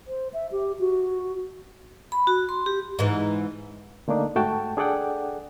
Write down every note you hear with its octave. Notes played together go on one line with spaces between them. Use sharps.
C5
E5
G4
F#4
B5
F#4
C6
G4
G#2 E3
D3 A3 A#3 D4 D#4
G#2 A3 F#4 G5 A5
D4 G#4 A4 D5 F#5 G5